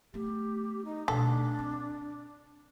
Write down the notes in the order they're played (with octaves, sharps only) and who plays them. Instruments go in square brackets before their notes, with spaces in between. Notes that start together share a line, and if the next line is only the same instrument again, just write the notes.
[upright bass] A3 B3 [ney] G4
[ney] D#4
[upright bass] D2 B2 [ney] D4 [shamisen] A4
[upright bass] C4